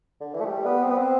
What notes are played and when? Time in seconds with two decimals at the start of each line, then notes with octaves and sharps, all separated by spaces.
0.21 D3
0.34 E3
0.41 A3
0.45 G3
0.65 B3
0.83 C4
0.90 B3
0.98 C4